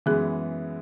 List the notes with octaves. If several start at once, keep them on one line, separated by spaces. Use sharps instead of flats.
F#2 E3 G#3 B3 G#4